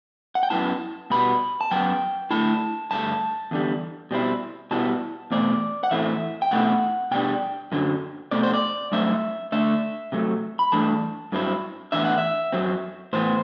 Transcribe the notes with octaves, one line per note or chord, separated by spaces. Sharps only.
F#5
G5
F#2 E3 B3 E4 A5
B2 G3 B3 B5
A5
F#2 F#3 B3 G5
D3 A3 E4 A5
G2 D3 A3 A5
E2 D3 G3
B2 G3 C4 E4
B2 G3 B3 E4 A5
E2 B2 A3 C4 D5
F#5
A2 E3 A3 C4 E4 E5
G5
B2 A3 C4 E4 F#5
B2 G3 D4 G5
F#2 D3 F#3
B2 A3 C4 D5
C5
D5
G2 F#3 A3 C4 E5
D3 A3 D4 E5
C3 F#3 A3
B5
G2 E3 A3 D4 A5
G2 F#3 C4 E4
A2 E3 B3 D4 E5
F#5
E5
F#2 F#3 C4
A2 E3 B3 C5